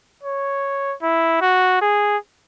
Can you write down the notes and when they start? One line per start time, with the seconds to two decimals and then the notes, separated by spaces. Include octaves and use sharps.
0.23 C#5
1.02 E4
1.41 F#4
1.82 G#4